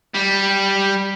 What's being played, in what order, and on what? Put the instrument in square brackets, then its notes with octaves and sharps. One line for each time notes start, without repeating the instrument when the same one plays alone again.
[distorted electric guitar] G3